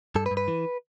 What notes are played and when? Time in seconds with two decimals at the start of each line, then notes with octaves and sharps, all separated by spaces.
0.15 G2 A4
0.26 B4
0.31 G2
0.37 B4
0.48 E3